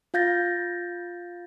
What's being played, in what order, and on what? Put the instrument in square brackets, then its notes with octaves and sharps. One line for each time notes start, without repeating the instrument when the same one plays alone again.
[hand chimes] F4 F5 G6 A6 A#6